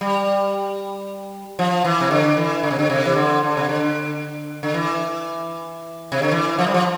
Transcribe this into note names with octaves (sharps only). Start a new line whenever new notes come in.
G3
F3
E3
C3
D3
E3
D3
C3
D3
C3
E3
D3
D3
C3
D3
D3
E3
C3
D3
E3
F3
G3
F3